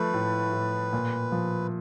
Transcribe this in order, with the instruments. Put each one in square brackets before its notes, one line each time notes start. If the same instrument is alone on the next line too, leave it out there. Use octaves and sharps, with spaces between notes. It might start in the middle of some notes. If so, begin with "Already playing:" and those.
Already playing: [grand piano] F3 A3 [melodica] B4
[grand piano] A2
A2
A#2
F3